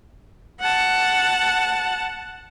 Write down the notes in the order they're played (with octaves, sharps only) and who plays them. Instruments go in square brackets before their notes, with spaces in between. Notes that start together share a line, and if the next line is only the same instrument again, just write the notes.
[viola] F#5 A5